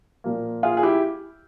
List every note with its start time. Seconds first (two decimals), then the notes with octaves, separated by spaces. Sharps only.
0.24 A#2 F3 A#3
0.63 F4 G#4
0.77 G#4
0.83 E4 G4